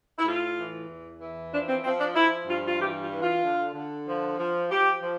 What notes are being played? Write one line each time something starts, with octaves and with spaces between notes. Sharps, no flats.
E4
A2 F4
E3
E2
E3
F3 D4
C4
F3 C4
D4
F3 E4
G2 F4
F4
E3 G4
F4
E3
F4
D3
D3
F3
F3
F3 G4
F3